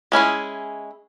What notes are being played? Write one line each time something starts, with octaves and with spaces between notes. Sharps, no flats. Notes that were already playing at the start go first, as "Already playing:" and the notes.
G#3 C#4 E4 G#4